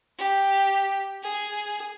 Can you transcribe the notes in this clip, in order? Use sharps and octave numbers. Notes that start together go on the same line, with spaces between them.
G4
G#4